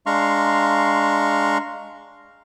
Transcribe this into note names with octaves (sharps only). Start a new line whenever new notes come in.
G#3 D4 F5 A#5 C6 C#6